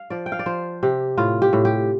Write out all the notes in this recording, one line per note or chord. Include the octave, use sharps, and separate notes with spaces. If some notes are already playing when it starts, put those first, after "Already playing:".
Already playing: F5
F3 D5
G5
F5
D5
F3 C5
C3 G4
A2 F4
G4
A2
G4